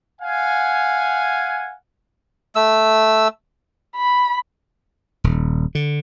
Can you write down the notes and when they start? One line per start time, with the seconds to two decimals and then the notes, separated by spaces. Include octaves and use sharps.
0.21 F5 F#5 G#5
2.55 A3 E6
3.96 B5
5.24 D#1
5.75 D3